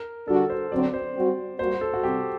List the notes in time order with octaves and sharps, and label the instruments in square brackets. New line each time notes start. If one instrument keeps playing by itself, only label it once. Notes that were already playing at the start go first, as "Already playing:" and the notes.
Already playing: [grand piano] A#4
[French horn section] D3 G3 D4 F#4 [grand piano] A4
[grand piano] C5
[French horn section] D3 F#3 C4 [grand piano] D5
[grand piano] C5
[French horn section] G3 C4 F#4
[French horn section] G3 A#3 F#4 [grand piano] C5
[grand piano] A4
F#4
[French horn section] C3 G3 C4 [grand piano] G4